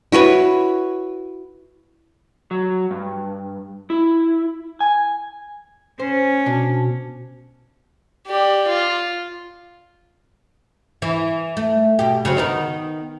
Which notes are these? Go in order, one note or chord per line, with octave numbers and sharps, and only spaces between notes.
E4 F#4 B4 C#5
F#3
G2
E4
G#5
C#4 C5
B2 D4
G4 D5
F4
E3
A3
B2 G4
C#3 F#3 C4
D#3 B3 D#4